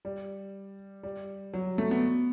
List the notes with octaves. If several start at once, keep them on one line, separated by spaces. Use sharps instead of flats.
G3
G3
F#3
A3
B3